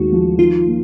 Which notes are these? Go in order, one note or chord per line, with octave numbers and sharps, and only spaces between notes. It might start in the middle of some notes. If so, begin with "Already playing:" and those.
Already playing: D#2 G#3 F#4
F3
D#3 F4
A#3